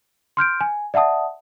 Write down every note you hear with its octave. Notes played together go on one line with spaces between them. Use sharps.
C6 F6 G6 D7
G#5
D5 E5 F#5 A5 D#6